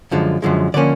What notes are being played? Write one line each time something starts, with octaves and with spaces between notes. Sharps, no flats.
F#2 D3 F3 G#3
F#2 D3 F3 G#3
D3 F3 A#3 C#4 D5